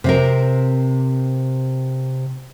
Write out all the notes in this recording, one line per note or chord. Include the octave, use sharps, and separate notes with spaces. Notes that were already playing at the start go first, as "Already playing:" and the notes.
C3 C4 A#4